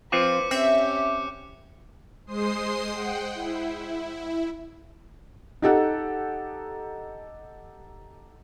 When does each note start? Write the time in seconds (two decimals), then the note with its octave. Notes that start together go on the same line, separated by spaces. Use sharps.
0.12 F3 C4 F4 B4 C5 D6 F#6 C#7
0.51 C4 C#4 G4 E5
2.26 G#3 C5 C6 D#6 C7
2.90 F#5 G5
3.35 E4
5.62 D#4 G4 A4 F#5